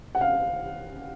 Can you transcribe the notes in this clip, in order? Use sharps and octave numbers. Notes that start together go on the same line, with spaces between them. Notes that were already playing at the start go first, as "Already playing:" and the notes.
F#5
F5